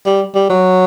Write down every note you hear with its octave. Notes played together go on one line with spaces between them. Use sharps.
G3
G3
F#3